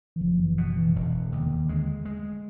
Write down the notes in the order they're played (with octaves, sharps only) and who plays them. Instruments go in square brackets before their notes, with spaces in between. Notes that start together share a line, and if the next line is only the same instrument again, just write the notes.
[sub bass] E3
[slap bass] F#1 [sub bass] F3
[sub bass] E3
[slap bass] B2 [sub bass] E3
[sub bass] E3
[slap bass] E1
[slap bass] D#2 [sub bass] D3
[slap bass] G#3
G#3